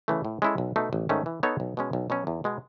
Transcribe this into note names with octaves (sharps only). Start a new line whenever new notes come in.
C#3 E3 A3
A2
G#3 C#4 E4 A4
B1
B2 A3 D#4
A1
G#2 D#3 A3 C#4
E3
B3 D#4 A4 C#5
B1
B2 G#3 C#4
B1
B2 F#3 C#4
E2
B2 G#3 B3